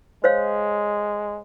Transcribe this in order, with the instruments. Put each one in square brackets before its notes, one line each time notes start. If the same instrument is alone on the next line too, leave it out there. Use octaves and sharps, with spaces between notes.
[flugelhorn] G#3 [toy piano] C5 C#5 F5